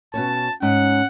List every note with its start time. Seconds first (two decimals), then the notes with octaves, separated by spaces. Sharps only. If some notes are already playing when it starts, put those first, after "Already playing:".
0.14 B2 C#4 C#5 A5
0.62 G#2 C#4 F#5